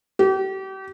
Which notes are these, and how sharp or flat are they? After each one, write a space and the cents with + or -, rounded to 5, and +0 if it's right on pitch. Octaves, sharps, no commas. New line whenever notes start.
G4 -35